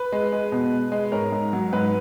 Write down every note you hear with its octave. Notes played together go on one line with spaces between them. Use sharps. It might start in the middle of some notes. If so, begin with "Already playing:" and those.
Already playing: B4
G#3
G#3
B2
G#3
G#3
G#2 A#4 C#5
G#2
F#3
G#2 B4